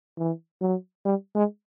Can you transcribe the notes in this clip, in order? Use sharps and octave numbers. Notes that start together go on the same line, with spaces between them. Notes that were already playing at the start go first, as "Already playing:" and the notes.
E3
F#3
G3
G#3